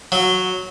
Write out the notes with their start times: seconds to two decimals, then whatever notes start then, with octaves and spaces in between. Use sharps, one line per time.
0.12 F#3